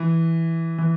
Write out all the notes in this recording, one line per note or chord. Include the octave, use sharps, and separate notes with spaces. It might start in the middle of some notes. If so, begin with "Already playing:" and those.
Already playing: E3
E3